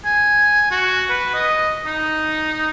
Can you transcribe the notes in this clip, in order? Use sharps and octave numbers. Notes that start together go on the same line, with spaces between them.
G#5
F#4
B4
D#5
D#4